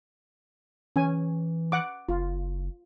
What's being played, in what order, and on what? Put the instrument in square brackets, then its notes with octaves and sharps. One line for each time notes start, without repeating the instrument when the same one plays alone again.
[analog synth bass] E3 [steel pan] C#4 G#5
[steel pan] F#5 D6
[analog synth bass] F#1 [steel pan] F4